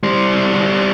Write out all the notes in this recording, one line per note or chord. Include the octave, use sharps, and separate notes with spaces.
G3 C5